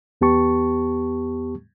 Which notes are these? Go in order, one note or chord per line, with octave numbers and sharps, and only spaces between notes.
E2 B3 G4 A5 C#6